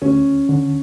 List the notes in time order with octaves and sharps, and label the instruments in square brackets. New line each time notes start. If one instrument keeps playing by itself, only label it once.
[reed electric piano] D2 [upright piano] C#4
[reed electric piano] D3